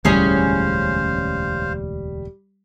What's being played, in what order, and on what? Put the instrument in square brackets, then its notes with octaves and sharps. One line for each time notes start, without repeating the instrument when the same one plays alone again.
[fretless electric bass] E1 D2 A2 [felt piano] G3 [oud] C#4 G#4 [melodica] C5 F5